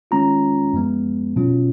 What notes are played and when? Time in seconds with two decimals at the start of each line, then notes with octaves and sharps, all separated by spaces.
0.11 D#3 G#3 C#4 F4 A#5
0.73 F#2 F3 G#3 B3
1.36 B2 F#3 C#4 F4